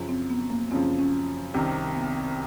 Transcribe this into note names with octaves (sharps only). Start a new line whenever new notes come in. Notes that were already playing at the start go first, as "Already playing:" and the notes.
Already playing: F#2 C#3 F3
C4
B3
A#3
F#2 C#3 F3 C4
C#4
C2 C3 D#3 C#4
B3